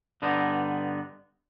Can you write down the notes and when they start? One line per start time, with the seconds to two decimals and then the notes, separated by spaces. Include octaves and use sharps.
0.22 G2 D3 B3 D4 D#4